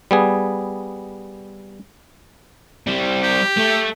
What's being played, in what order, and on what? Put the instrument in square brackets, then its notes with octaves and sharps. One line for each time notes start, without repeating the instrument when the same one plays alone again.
[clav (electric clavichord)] G3 B3 G#4
[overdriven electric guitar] G3 C4
[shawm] G4
[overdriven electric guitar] A3